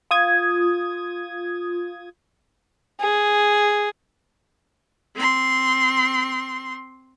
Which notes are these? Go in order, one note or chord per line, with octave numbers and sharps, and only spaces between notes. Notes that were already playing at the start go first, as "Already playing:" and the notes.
F4 D#6 G#6
G#4
C4 C6